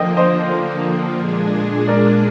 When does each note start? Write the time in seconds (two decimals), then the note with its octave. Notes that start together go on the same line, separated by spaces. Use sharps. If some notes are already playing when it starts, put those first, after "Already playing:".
Already playing: D3 F3 A#3 D#5 G5
0.17 C5 D#5
1.15 A#2 G#3 D4 G#4
1.88 A#4 D5